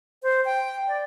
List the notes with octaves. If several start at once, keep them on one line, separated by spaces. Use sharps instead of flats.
C5
G5
D5